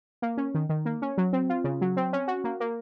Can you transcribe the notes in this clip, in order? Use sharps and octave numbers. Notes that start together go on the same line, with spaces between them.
A#3
C#4
D#3
D#3
A#3
C#4
F#3
C4
F4
C#3
F#3
C4
C#4
F#4
A#3
A#3